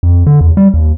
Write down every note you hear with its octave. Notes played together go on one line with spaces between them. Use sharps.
F2
D3
E2
G3
D#2